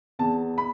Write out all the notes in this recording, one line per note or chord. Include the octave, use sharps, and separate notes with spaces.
E2 A5
B5